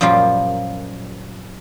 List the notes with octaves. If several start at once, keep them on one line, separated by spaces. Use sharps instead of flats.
F#2 A#2 F3 G3 F4